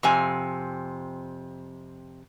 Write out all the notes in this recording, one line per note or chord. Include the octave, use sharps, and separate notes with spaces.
F2 C3 G#5